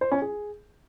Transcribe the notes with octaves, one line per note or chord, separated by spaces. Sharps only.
C5
C#4
G#4